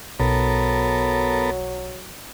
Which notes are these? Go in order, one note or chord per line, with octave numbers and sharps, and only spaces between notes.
B1 F#3 B3 A4 A#4